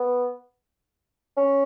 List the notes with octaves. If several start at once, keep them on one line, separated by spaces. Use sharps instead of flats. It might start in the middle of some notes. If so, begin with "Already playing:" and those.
Already playing: B3
C#4